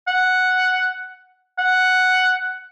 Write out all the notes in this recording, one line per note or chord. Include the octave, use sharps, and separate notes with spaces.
F#5
F#5